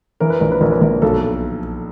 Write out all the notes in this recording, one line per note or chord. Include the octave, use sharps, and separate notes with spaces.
E3 A#4
B4
A#1 A#4
B4
A#1 A#4
B4
A#1 A#4
B1 A4